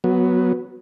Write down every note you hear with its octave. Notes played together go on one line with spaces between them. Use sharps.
F#3 B3